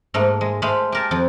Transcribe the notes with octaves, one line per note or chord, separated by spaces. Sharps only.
G#2 A3 A#3
G#3
G#3 A3 C5 F5 B5
G4 A#4 A5
F2